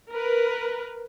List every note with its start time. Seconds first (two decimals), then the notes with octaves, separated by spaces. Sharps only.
0.11 A#4 B4